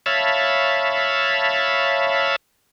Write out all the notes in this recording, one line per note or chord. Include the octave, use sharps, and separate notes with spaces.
C#5 E5 F5 A5 B5